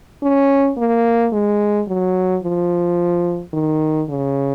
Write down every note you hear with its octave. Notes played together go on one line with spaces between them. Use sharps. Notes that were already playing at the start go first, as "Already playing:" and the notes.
C#4
A#3
G#3
F#3
F3
D#3
C#3